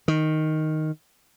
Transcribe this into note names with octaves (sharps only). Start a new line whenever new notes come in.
D#3